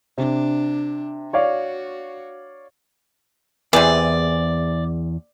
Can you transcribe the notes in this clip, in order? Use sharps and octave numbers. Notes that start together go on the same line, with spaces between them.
C3 D4
F#4 C#5 D5 F5
E2 C3 E3 G#4 D5